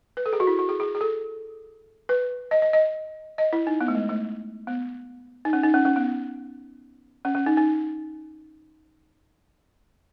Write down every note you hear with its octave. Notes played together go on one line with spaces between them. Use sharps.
B4
A4
G#4
F#4
E4
F#4
G#4
G#4
G#4
A4
B4
D#5
D#5
D#5
D#5
E4
D#4
B3
A3
G#3
A3
B3
D#4
C#4
D#4
C#4
C#4
B3
C#4
C#4
D#4
D#4